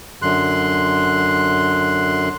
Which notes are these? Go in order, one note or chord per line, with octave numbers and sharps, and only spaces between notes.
F#2 D3 C6 F#6